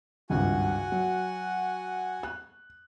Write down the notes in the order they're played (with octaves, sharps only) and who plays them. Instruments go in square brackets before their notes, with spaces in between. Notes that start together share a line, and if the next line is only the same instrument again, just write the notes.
[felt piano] G#1 C#2 G2 [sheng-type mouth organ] F#4 F#5 G#5
[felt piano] F#3
F#6